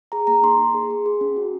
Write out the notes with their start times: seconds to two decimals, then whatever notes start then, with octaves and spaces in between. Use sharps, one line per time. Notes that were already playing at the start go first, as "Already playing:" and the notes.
0.12 G#4 A#5
0.27 A#3 A#5
0.43 D#4 C6
0.59 A#3
0.74 G#4
0.90 G#4
1.06 G#4
1.21 C#4
1.36 F#4